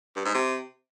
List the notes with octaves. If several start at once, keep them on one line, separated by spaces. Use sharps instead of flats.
G2
G#2
C3